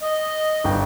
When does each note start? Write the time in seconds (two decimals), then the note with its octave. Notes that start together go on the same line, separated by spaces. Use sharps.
0.01 D#5
0.64 G1 G5